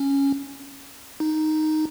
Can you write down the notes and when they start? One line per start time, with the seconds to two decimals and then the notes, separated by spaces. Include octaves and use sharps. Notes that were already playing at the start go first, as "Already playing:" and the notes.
Already playing: C#4
1.20 D#4